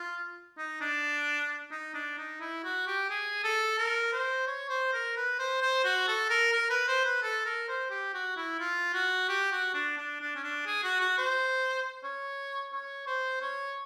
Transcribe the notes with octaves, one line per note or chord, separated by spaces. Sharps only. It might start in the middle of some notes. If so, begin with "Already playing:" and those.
Already playing: F4
D#4
D4
D#4
D4
D#4
E4
F#4
G4
G#4
A4
A#4
C5
C#5
C5
A#4
B4
C5
C5
F#4
A4
A#4
A#4
B4
C5
B4
A4
A#4
C5
G4
F#4
E4
F4
F#4
G4
F#4
D4
D4
D4
C#4
D4
G#4
F#4
F#4
C5
C#5
C#5
C5
C#5